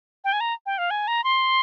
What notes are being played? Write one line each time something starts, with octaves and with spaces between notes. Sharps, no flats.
G5
G#5
A#5
G5
F5
G#5
A#5
C6